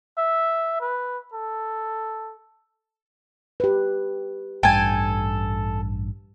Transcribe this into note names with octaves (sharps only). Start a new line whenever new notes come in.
E5
B4
A4
G4 B4
A1 G2 A4 G5 G#5